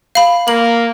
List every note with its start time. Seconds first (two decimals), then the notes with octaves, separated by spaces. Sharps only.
0.15 F5 B5
0.48 A#3 F#7